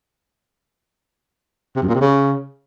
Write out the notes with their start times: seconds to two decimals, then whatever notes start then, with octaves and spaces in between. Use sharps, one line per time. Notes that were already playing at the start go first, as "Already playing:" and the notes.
1.76 C3
1.82 F#2
1.88 A#2
1.95 C3
2.01 C#3